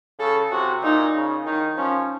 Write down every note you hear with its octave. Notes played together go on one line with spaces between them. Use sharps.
C#3 A4
C3 F#4
A#2 D#4
C#3
D#3 D#4
F3 C#4